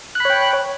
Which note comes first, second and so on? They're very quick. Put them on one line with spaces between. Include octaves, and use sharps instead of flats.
F#6 B5 C#5 G5